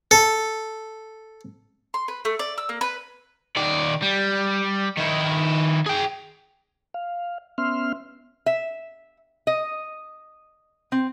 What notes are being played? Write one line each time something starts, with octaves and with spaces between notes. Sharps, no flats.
A4
C6
B4
A3
D5
E6
A#3
B4
D#3 D5
G3
D#3 E4
G#4 G5
F5
B3 C#4 E5 C6 F6
E5
D#5
C4